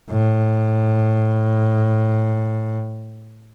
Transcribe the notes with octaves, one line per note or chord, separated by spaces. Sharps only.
A2